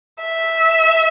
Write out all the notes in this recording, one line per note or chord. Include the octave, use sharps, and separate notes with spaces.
E5